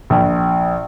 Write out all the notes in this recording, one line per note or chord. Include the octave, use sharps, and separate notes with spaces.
A#1